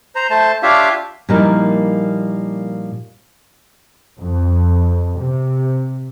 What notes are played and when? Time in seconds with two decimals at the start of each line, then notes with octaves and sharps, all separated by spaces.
0.15 C5 A#5
0.30 A3 C5 A5
0.63 D4 F4 G4 C#5 E5 F5
1.29 A#2 F3 G3 A#3 D#4 E4
4.21 F2
5.20 C3